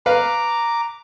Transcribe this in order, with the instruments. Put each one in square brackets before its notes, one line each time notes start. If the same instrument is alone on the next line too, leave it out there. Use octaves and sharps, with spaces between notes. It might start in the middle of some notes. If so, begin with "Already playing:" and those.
[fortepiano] B4 F5 [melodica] A#5 D6